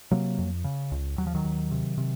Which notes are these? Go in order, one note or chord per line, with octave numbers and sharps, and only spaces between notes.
C3 F#3 A#3
F2
C#3
C#2
D#2 F#3
F3
D#3 F#3
D#2
C3
C3